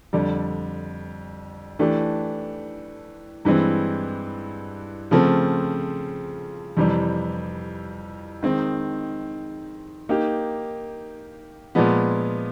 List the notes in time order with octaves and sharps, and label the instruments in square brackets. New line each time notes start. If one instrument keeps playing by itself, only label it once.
[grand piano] F2 D3 G3
E3 A3 D4 G4
G2 E3 G#3 C4
C#3 F3 A3 C4
F2 C3 E3 G3
D#3 G#3 C4 D#4
A#3 D#4 G4
A#2 F3 G#3 B3